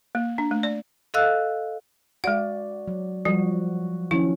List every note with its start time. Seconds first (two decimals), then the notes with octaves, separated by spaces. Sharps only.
0.15 A#3
0.38 D4
0.51 A3
0.63 D5
1.14 A4 D#5 F5 E6 F#6
2.24 G#3 F#4 D5 F#5
2.88 F#3
3.25 F3 G3 F#4
4.11 D#3 F3 C#4 E4